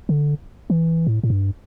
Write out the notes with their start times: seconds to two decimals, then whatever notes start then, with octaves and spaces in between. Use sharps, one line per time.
0.09 D3
0.70 E3
1.07 A2
1.24 A2
1.30 G2